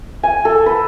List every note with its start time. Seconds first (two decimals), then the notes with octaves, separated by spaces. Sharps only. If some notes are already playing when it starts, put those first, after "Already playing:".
0.23 G#5
0.45 A4
0.66 B4